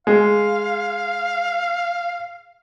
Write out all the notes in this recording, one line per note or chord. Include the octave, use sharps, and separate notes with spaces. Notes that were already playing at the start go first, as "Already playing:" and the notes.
G#3 F5